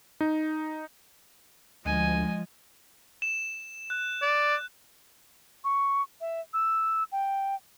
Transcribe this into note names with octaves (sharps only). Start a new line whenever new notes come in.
D#4
D2 F3 G#3 D#5 G#5
E7
F#6
D5
C#6
E5
E6
G5